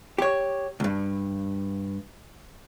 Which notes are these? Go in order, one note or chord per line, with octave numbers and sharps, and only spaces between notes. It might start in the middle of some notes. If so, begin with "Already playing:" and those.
G4 C#5
C#2 G2